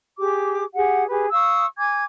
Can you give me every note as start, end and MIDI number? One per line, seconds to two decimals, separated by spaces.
0.18 0.63 67
0.18 0.63 68
0.18 0.63 86
0.74 1.05 67
0.74 1.05 68
0.74 1.05 78
1.09 1.26 67
1.09 1.26 68
1.09 1.26 71
1.31 1.65 77
1.31 1.65 85
1.31 1.65 87
1.31 1.65 88
1.77 2.04 80
1.77 2.04 86
1.77 2.04 92